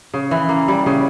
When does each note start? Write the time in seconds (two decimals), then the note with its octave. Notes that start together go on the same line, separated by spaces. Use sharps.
0.14 C#3
0.31 E3
0.49 A#3
0.68 G3
0.86 C#3